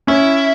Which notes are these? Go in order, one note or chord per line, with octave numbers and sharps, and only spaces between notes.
C#4 E4